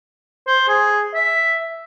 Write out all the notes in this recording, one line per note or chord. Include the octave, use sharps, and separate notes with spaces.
C5
G#4
E5